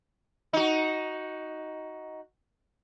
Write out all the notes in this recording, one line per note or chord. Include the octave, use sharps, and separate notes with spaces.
D#4 F#4